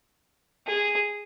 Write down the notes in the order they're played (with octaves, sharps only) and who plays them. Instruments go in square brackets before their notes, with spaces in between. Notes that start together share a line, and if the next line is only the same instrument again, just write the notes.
[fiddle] G#4